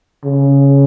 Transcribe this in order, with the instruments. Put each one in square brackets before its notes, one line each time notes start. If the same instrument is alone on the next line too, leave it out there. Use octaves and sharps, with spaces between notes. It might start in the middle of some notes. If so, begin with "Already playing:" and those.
[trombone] C#3